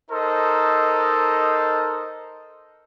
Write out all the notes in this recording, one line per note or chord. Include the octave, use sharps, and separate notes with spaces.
D#4 A4 A#4 C5 D#5